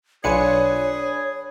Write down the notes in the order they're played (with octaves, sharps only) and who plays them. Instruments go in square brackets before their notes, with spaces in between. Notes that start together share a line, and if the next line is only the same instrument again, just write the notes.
[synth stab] B1 F4 C#7 [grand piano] D4 B4 G#5 [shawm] G#4 [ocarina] C#5